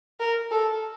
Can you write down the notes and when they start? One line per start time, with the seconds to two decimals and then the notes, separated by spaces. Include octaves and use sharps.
0.20 A#4
0.51 A4